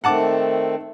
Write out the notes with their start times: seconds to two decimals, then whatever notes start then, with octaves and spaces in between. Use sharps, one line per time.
0.04 D#3 A3 C4 F#5 A5 D6